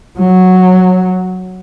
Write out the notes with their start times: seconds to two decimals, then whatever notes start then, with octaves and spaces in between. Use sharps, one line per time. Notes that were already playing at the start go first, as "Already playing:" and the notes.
0.19 F#3